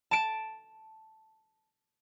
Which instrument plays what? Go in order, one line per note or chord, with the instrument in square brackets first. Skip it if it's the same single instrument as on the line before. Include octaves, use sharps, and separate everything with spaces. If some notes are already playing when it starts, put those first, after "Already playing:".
[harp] A5 D7